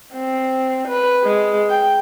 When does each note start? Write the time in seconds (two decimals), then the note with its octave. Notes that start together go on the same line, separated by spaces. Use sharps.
0.14 C4
0.88 B4
1.24 G#3
1.70 G5